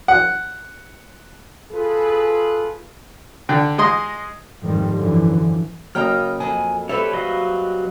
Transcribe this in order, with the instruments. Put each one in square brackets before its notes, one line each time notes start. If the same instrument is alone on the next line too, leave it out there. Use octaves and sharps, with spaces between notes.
[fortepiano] F#5
[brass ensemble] F4 G#4 A4 B4
[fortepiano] D3 G5
G#3 D#5 C6
[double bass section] F2 G#2 D#3 F3 G3
F#2 D3 E3 F3
[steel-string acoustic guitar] C#3 G5 A#5 [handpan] F#3 A#3 D#5 [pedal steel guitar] F6
[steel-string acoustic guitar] F2 [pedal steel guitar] G#5
[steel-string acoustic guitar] G3 C4 B4 [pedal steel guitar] A4 C#5 [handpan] E5
[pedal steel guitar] F#3 D#5 F5